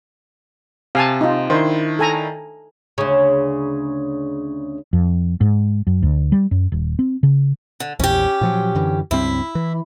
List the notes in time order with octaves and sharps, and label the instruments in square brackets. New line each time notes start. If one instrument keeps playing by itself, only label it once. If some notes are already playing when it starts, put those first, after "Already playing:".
[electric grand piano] C3 [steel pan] F5 G#5 A5
[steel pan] D#4 F4
[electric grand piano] D#3 D4 E4 [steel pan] C5
[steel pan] A4 G#5 A#5
[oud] D2 C#3
[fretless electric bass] F2
G#2
F#2
D2
G3
F#2
D#1
C4
C#3
[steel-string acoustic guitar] D3
[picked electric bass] A#1 E2 [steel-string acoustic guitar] C#4 G4
[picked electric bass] A#2 F3 F#3
F#2 D3 E3
[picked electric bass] C#2 G2 C4 [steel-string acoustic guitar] E4
[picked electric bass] E3